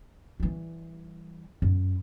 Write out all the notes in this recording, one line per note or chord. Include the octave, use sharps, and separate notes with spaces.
E3 G3
F#2